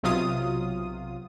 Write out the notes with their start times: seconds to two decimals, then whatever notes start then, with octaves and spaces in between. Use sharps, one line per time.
0.03 B1 C3 F#3 F4 D#6